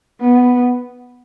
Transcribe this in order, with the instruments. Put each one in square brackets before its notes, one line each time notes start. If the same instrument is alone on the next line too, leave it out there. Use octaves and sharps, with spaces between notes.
[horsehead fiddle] B3